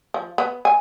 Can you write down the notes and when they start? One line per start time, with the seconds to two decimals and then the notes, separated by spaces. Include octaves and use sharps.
0.14 F3
0.38 B3
0.65 G#5